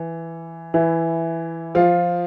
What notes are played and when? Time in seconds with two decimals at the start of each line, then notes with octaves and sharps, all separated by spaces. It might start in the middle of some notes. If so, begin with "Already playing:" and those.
Already playing: E3
0.74 E3 E4
1.75 F3 F4